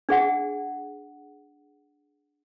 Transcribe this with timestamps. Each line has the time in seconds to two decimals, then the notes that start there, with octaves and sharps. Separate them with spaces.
0.09 D4 G#4 F#5